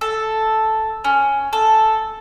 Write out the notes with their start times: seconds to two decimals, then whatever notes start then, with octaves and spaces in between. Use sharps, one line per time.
0.01 A4
1.04 C#4
1.53 A4